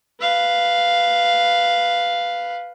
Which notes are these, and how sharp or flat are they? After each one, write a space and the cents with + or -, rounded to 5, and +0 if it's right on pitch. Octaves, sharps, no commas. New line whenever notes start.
B4 +0 F5 +0